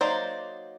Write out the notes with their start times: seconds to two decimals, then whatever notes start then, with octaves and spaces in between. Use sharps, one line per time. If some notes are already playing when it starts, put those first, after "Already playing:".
0.01 F#3 A#3 D#4 C5 D5